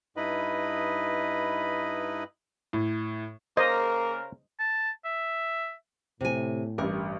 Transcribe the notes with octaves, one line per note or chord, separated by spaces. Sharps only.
G2 D#4 E4 B4 D#5 B5
A2
C#3 A#3 A#4 C5 D#5
A5
E5
A2 C3 G#5
A1 G2 A#4